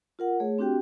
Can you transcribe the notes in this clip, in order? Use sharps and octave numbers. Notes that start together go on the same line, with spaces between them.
F4 A#4 F#5
A3 G#4 C#5
C4 D4 F#4 G4 G5